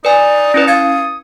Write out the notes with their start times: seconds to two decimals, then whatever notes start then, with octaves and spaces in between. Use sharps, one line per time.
0.05 D#4 B4 D5 G#5
0.54 C#4 D#4 E4 B4
0.67 F5 D#6 G#6 A6 C#7